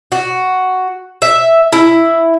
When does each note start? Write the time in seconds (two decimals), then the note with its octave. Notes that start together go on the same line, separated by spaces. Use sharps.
0.12 F#4
1.22 E5
1.73 E4